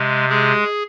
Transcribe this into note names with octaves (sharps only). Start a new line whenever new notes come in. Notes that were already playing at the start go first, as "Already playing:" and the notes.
Already playing: C3 G#3
G#3 G#4